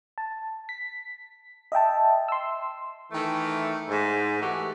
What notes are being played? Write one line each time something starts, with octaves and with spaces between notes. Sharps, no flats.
A5
B6
D#5 E5 G5 A5
C6 E6
D#3 E3 A3
G#2
E3 A3 F#4 G4